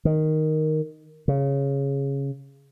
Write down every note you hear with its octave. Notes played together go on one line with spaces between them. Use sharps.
D#3
C#3